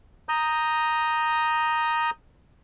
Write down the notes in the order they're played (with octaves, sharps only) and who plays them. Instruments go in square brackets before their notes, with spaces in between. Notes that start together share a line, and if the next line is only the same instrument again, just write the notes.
[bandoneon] A#5 D#6 G6